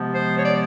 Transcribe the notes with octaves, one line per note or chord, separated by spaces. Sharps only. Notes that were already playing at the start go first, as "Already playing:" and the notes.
Already playing: C3 F3 G#3 B3
C5
C#5
D5